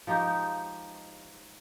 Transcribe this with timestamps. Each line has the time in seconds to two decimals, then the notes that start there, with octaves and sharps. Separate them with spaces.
0.07 F3 G#3 D#4 G4